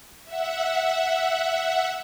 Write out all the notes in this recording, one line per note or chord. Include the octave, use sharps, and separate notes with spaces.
E5 F#5